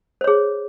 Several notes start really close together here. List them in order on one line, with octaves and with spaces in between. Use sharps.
C5 C#5 G#4